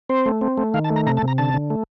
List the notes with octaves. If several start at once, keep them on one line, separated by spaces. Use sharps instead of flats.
C4 C5
A3
C4
A3
D#3 F5
A5
A3
A#5
C3 A#5
A5
C3
A#5
D3 A5
D3
A3